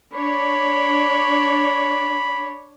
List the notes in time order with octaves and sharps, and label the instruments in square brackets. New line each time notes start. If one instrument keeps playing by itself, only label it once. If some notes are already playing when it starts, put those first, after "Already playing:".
[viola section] D4 C#5 [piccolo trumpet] B5